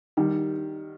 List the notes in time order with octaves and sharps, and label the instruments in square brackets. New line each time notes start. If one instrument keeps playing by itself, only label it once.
[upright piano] D#3 G3